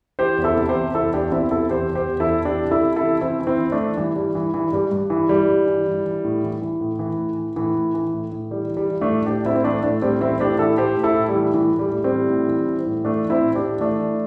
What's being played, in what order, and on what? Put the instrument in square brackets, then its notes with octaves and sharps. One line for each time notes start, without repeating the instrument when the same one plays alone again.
[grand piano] E3 G4 C5
E2
E4 A4
C3
G4 C5
E2
E2 E4 A4
E2 D4 G4
E2 C4 E4
C3 E4 A4
E2 G4 C5
E2
G4 C5
E2
E4 A4
E2
E3 D4 G4
C3
E4 A4
C3
E4 A4
E3
E3 C4 E4
E3
C4 E4
E3
A3 D4
E3
G2 E3
E3 G3
E3
G2 E3
G2 G3
G2
E3
E3 G3
G2
E3
E3
E3
A2
E3
E3
A2
E3
A2
E3
A2 E3
A2
E3
A2
A2
E3 G3
E3
G3
E3
A3 D4
A2
A2 D4 G4
A2 C4 E4
C4
E3 A3 D4
A2 A3 D4
A2 G3 C4
E3 C4 E4
A2 D4 G4
E3 E4 A4
A2 G4 C5
A2
E4 A4
A2
G3
E3
A2 E3
A2
G3
A2
G3 C4
E3
A2
E3
E3
A2
E3 A3 D4
E3
C4 E4
A2
D4 G4
A2
E3 A3 D4
E3